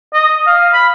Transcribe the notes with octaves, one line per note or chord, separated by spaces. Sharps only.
D#5
F5
B5